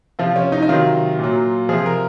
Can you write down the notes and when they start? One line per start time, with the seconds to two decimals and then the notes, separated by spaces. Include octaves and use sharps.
0.19 C3 F3 F4
0.36 C#4
0.52 D#4
0.62 D#4
0.69 C3 D#3 F#3 F4
1.19 A#2 F#3
1.69 C3 F3 G#4
1.86 A#4